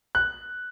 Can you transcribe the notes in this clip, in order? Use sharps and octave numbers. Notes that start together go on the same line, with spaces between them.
F#6